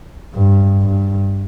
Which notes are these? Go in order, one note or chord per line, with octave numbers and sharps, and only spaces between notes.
G2
G2